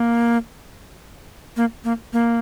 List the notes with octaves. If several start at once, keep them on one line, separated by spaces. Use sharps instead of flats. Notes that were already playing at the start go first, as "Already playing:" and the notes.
Already playing: A#3
A#3
A#3
A#3